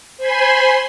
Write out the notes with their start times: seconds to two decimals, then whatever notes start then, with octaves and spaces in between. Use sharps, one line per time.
0.18 C5 G#5 B5 C6